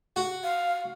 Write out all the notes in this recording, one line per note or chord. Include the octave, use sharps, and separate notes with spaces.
F#4
F5